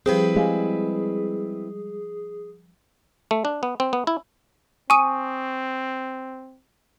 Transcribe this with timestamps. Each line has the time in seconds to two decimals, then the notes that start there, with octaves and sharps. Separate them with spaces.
0.06 F3 G3 C4 E4 G4 G#4 B4
0.36 G3 G#3 F5 G#5
3.31 A3
3.45 D4
3.63 B3
3.80 C4
3.93 B3
4.07 E4
4.90 C4 G#5 C#6 D#6 D#7